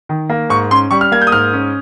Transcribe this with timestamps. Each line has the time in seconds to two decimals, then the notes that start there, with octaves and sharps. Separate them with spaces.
0.09 D#3
0.30 A#3
0.49 G#2 C#6
0.71 C#4 C6
0.91 G3 C#6
1.01 F6
1.12 A#3 G#6
1.21 G6
1.27 D#6
1.32 G#2 F6
1.53 C#4